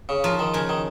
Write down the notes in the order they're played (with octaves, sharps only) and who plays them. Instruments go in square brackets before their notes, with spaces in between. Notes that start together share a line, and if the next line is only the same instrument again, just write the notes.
[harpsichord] C#3
[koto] F3 [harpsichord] A#4
[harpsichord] D#3
[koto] C#3 [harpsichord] A#4
[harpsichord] D#3